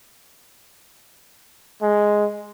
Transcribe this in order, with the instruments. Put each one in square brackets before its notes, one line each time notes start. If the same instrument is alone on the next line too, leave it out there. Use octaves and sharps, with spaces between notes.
[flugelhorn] G#3